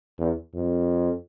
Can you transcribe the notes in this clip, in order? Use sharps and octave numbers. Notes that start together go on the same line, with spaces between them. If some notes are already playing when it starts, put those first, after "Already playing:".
E2
F2